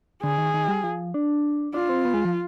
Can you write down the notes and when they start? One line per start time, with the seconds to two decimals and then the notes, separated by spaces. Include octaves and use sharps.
0.23 D3 G#4
0.38 D#3
0.54 D#3
0.68 G3
0.83 F3
1.14 D4
1.74 D4 F4
1.89 C4
2.05 B3
2.14 G#3
2.25 F3